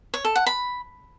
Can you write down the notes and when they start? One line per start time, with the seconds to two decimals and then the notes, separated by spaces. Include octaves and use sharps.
0.14 C#5
0.25 A4
0.36 F#5
0.46 B5